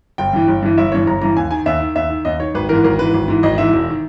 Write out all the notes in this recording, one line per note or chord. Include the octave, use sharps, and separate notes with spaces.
G1 G5
G2 E3
G1
G2 E3
G1 E5
G2 E3 C#5
G1 A#5
G2 E3 A#5
D#2 G#5
D#3 G#5
D#2 E5
D#3
D#2 E5
D#3
D#2 D#5
D#3 C#5
G#1 B4
G#2 E3 A#4
G#1 A#4
G#2 E3 B4
G#1
G#2 E3
G#1 D#5
G#2 E3 E5
E1
D#3